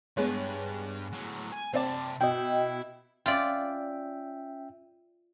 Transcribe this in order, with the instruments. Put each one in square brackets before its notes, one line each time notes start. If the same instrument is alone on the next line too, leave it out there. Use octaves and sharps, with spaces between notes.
[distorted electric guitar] G2 B4 [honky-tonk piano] G#3 B3 C#5
[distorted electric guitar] A2 F#3
G#5
[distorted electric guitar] C3 A5 [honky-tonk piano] C4 D5
[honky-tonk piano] B2 [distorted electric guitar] E4 [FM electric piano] D#5 G5
[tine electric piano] C#4 E5 G5 [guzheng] F4 D5